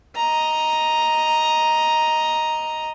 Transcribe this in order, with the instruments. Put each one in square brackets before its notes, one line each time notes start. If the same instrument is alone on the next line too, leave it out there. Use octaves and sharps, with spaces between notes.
[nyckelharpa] D#5 A#5